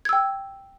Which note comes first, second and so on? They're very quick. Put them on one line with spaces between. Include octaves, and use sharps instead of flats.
G#6 E6 G5